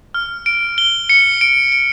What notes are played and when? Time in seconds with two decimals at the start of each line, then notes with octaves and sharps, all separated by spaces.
0.14 F6
0.46 D7
0.78 G7
1.09 C#7
1.41 D7
1.72 D7